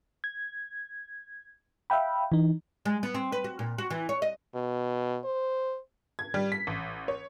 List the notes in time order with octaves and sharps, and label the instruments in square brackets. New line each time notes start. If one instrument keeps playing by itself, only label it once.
[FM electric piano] G#6
E5 F5 G5 B5
E3 D#4
[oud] G#3
B3
C4
B4
F#4
A#2
F#4
E3
C#5
D#5
[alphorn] B2
C5
[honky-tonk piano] G#6
G3
B6
A1
C#5